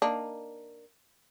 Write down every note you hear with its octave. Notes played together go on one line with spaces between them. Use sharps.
A#3 D4 D#4